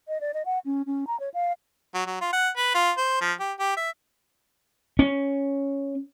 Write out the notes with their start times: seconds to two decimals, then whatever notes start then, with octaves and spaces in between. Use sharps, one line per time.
0.08 D#5
0.21 D5
0.34 D#5
0.45 F#5
0.65 C#4
0.86 C#4
1.07 A#5
1.20 C#5
1.34 F5
1.95 F#3
2.06 F#3
2.21 F4
2.33 F#5
2.57 B4
2.75 F4
2.98 C5
3.22 F3
3.40 G4
3.60 G4
3.77 E5
4.99 C#4